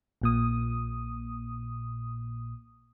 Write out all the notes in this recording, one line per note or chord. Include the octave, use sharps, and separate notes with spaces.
A#1 A#2 D#6